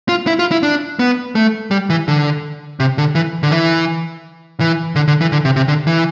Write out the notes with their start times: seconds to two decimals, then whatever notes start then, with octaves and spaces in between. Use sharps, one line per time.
0.09 F4
0.27 E4
0.39 F4
0.51 E4
0.63 D4
0.99 B3
1.35 A3
1.71 G3
1.90 E3
2.08 D3
2.80 C3
2.98 D3
3.15 E3
3.43 D3
3.52 E3
4.60 E3
4.96 D3
5.08 D3
5.21 E3
5.32 D3
5.45 C3
5.56 C3
5.68 D3
5.87 E3